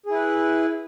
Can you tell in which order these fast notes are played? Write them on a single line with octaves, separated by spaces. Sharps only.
G#4 E4 B4